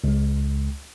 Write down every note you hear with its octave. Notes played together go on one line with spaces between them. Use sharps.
C#2 G#3